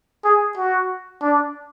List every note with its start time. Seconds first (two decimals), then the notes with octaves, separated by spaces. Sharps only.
0.25 G#4
0.57 F#4
1.22 D4